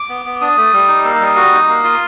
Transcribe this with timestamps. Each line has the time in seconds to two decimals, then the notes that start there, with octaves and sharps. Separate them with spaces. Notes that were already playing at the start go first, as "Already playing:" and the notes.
Already playing: D6
0.09 B3
0.26 B3
0.41 D4 D#6
0.57 A3
0.73 G3
0.88 D#4
1.04 A#3 E6
1.15 E6
1.21 G3
1.26 D#6
1.36 F#4
1.52 D#4
1.68 A#3
1.84 F4